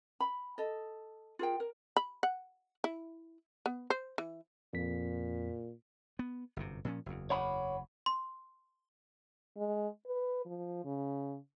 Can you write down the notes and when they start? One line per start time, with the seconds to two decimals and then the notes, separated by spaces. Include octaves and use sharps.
0.20 B5
0.58 A4 D#5
1.39 F4 G#4 A#4 G5
1.60 A#4
1.96 B5
2.23 F#5
2.84 E4
3.66 B3
3.90 C5
4.18 E3
4.74 F2 A#2 B6
6.19 B3
6.56 G1 F#2 C3
6.85 A#2 F3 C#4
7.06 F#1 E2
7.30 C#5 F#5 B5
8.06 C6
9.57 G#3
10.07 B4
10.45 F3
10.84 C#3